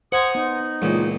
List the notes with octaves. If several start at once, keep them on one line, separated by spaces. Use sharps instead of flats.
C5 F#5 G#5 A#5 D#6
B3 D#4
C#2 A#2 E3 G#3